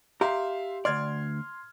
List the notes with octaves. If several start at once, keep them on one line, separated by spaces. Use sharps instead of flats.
G4 E5 F5 A#5 C6
D2 D5 C6 F6 G#6